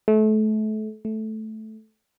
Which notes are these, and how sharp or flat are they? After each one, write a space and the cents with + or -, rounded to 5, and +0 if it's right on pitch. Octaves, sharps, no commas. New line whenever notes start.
A3 -30
A3 -10